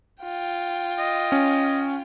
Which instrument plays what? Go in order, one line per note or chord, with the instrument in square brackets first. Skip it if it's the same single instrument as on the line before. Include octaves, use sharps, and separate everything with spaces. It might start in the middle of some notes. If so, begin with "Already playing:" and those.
[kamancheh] F4 G5
[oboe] D#5
[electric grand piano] C#4